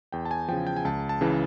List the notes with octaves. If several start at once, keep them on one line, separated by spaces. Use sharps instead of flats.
E2 G5
A5
G#5
C#3 F3 G5
G5
G#5
C#2 A5
A5
C#3 E3